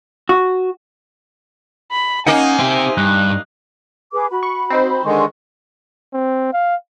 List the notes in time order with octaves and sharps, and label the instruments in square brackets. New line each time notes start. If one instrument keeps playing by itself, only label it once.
[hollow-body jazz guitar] F#4
[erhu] B5
[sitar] A#3 D#4 [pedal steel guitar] C#4 F#5 [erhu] G#5
[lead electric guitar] C4 G4 [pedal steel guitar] C5 E5
[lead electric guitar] G2 [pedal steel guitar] F#6
[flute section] G#4 B4 D6
F#4 B5
[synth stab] C#6
C4 D#4 C5
[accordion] D3 D#3 G#3 [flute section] G#5 C6 C#6
[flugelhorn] C4
F5